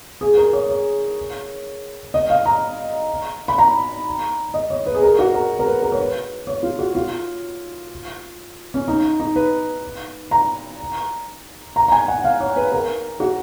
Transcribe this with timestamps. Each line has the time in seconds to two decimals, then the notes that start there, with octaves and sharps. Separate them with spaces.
0.21 G#4
0.37 A#4
0.53 C#5
0.69 C#5
2.14 D#5
2.30 F5
2.45 A#5
3.48 B5
3.58 A#5
4.54 D#5
4.70 C#5
4.86 B4
4.94 G#4
5.02 A#4
5.19 F#4
5.34 A#4
5.59 A#4
5.66 B4
5.82 A#4
5.92 C#5
5.99 B4
6.47 C#5
6.63 F4
6.79 F#4
6.95 F4
8.74 C#4
8.88 D#4
9.20 D#4
9.36 B4
10.31 A#5
11.76 A#5
11.88 A#5
11.92 G#5
12.08 F#5
12.24 F5
12.40 C#5
12.56 B4
12.72 A#4
13.20 F#4